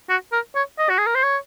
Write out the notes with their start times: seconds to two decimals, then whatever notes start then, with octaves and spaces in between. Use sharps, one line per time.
0.09 F#4
0.32 A#4
0.55 C#5
0.78 D#5
0.90 F#4
0.98 G#4
1.06 A#4
1.15 C5
1.23 C#5